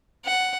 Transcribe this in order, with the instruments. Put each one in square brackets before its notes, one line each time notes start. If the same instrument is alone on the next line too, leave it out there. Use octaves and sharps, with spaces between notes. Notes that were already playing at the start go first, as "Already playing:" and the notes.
[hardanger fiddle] F#5